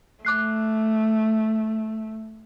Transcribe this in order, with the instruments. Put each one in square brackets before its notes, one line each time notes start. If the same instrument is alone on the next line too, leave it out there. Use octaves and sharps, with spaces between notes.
[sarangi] A3 [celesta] D6 F#6 C7